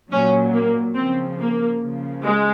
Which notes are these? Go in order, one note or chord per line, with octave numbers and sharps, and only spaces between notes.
A#2 F#3 C#4
A#3
C#3 F3 C4
A#3
C#3 F3
G#3